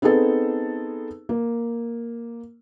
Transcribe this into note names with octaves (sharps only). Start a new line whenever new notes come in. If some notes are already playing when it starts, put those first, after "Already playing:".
B3 C4 D#4 G#4 A4
A#3